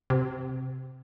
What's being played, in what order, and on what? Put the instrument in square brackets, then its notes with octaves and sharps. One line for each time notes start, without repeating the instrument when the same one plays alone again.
[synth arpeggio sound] C3